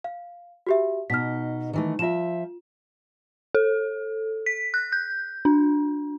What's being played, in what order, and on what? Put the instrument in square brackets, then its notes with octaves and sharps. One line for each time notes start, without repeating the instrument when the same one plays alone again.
[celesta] F5
F#4 G4 E5
[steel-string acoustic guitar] B2 D#4 [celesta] F6 B6
[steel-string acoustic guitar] D#3 E3 A3
[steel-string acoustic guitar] F3 E5 [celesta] F4 E7
[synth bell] A4
B6
F#6
G6
D4